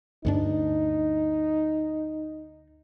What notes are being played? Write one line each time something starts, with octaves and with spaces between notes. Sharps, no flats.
D2 G2 D4 D#4